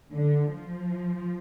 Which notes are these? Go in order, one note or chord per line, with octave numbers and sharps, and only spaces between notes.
D3
F3